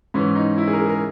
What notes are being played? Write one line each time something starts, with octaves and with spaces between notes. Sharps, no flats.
G#2 E3 C#4
D#4
E4
G#4
A#4
G#4
A#4